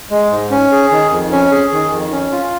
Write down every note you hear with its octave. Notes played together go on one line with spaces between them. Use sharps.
G#3
G#2
C#4
G#4
D#3
F2
C#4
G#4
D#3
F2
C#4
F4